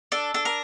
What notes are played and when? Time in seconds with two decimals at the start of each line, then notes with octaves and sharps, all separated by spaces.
0.12 D4 A4
0.34 D4 A4
0.45 A#4